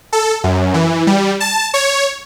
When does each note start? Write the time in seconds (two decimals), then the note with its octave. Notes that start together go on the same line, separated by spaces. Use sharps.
0.13 A4
0.44 F#2
0.74 E3
1.07 G3
1.40 A5
1.74 C#5